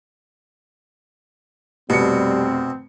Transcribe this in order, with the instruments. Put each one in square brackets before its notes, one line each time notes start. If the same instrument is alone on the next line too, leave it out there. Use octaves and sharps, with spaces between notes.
[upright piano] F1 C#7 [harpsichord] B2 [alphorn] G3 [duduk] C4